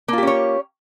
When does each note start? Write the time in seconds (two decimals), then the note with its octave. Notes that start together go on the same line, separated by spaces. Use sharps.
0.08 A#3
0.13 F4
0.18 G4
0.23 C#4
0.27 C#5